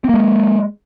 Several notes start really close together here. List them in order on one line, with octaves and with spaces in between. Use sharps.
C4 A#3 G#3